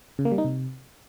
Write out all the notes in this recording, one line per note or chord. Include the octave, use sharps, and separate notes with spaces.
C#3
A#3
G3
D#4
C3